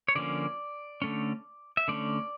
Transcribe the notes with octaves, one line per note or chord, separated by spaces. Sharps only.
C#5
D3 F3 A#3 C#4 D5
D3 A3 C#4
E5
D3 A3 C#4 D5